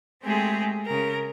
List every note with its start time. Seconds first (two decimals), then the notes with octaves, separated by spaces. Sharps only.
0.22 G#3 A3 C4 G4 G#4
0.86 C#3 A#4